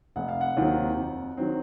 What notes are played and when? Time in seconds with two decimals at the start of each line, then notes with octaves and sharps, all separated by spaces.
0.16 F1 F#5
0.28 F5
0.41 F#5
0.57 D#2 D#3 F#3 C4
0.97 F2
1.37 D#3 F#3 C4